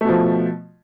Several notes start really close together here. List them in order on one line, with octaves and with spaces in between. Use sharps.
A3 B2 F3